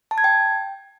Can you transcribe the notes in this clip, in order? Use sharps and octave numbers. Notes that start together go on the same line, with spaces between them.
A5
G#6
G5